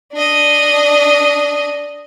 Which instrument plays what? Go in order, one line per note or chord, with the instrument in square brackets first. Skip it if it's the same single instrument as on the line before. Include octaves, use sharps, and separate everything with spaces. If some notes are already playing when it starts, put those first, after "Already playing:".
[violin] D4 D#5